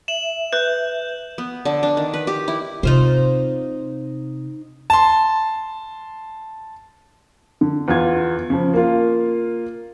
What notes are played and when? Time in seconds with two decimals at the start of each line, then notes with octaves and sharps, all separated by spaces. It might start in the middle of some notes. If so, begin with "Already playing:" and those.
0.08 E5 E7 F#7
0.53 B4 G6
1.38 B3
1.65 D3
1.83 D4
1.97 D#3
2.14 B4
2.27 G4
2.48 E4
2.83 C3 D#4 F4 C5
4.90 A5 C6
7.61 D3
7.88 E2 F4 G#6
8.50 C#3 F3
8.74 A#3 F4